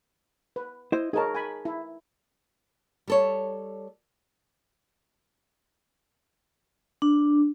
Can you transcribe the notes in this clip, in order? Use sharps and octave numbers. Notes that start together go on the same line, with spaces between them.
B4
E4 C5 D#5
D#4 G#4 A#4 C#5 A5
G#5 B5
E4
G3 A4 C#5
D4